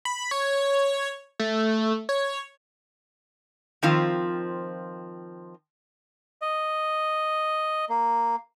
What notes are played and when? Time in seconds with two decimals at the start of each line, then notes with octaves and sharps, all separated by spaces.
0.05 B5
0.31 C#5
1.40 A3
2.09 C#5
3.82 D#3 F3 C4 F4
6.42 D#5
7.89 A#3